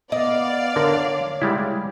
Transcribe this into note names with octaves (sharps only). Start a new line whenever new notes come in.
B3 D5 D#5 F5
D3 A#4 C#5
G3 G#3 E4